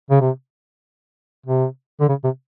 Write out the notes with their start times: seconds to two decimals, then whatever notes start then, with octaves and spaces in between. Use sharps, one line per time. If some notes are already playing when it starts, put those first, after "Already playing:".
0.10 C#3
0.21 C3
1.46 C3
2.00 D3
2.09 C#3
2.24 C3